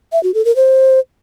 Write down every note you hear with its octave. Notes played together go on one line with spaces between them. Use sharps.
E5
F#4
A4
A#4
C5